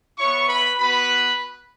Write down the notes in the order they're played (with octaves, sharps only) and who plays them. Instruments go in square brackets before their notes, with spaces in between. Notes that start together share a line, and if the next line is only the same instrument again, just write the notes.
[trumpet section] B3 E4 C#5 C#6
B4 B5
B3 F#4 B4 B5